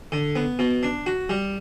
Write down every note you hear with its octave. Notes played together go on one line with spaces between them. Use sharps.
D3
B3
B2
D4
F#4
G3